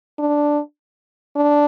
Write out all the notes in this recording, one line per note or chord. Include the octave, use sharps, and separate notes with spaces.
D4
D4